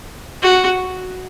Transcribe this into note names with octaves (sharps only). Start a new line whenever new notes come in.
F#4